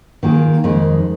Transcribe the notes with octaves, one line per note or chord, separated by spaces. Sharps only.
D#3 A#3 F4 G#4
F2 D#3 G#3